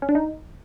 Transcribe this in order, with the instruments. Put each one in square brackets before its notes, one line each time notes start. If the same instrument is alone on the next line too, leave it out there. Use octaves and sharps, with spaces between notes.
[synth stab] C#4
D4
D#4